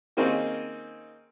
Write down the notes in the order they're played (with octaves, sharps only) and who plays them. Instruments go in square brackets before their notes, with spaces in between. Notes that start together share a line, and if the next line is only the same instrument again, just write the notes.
[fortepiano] D#3 A#3 C4 C#4 D#4 G#4